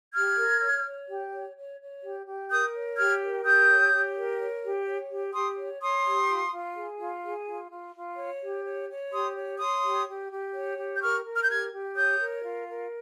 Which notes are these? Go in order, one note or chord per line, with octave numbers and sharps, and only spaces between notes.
G4 F6 G#6
A#4
C#5
C#5
G4
C#5
C#5
C#5
G4
G4
A#4 D#6 G6
C#5
G4 F6 G#6
A#4
G4 D#6 G6
C#5
G4
A#4
C#5
G4
C#5
G4
G4 C6 D#6
C#5
C#5 C6 D#6
G4
F4
F4
G#4
F4
G#4
F4
F4
F4
C#5
G4
C#5
C#5
G4 C6 D#6
C#5
C#5 C6 D#6
G4
G4
G4
C#5
G4
G6
A#4 C#6 F6
A#4
F6
G6
G4 F6 G#6
G4
C#5 D#6 G6
A#4
F4
A#4